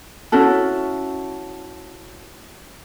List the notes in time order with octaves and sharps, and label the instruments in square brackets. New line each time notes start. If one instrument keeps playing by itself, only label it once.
[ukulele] C#4 E4 F#4 A4